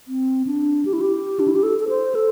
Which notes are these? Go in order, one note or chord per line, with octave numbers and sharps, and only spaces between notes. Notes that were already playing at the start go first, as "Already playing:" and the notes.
C4
D4
G4
E4
G4
D4
E4
G4
A4
A4
C5
A4